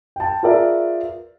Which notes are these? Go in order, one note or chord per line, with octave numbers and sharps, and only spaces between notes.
G5 A5
F4 G#4 A#4 B4 D5 E5